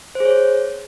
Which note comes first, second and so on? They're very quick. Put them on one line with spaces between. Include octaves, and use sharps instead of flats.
C5 G#4 C#5